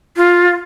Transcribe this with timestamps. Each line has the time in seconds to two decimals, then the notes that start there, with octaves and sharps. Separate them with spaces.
0.17 F4